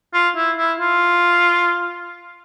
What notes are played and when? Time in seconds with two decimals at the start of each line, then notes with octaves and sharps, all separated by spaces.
0.13 F4
0.36 E4
0.57 E4
0.79 F4